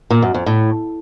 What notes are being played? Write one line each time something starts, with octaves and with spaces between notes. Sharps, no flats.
A#2
F#2
F2
A2